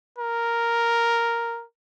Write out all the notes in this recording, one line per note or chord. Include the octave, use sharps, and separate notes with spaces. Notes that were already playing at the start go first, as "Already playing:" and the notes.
A#4